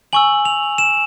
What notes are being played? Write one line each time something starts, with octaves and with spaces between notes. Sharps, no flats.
G#5 C#6 E6 F#7
F7
E7